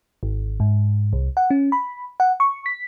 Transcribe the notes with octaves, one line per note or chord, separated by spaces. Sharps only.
G#1
G#2
C2
F#5
C#4
B5
F#5
C#6
B6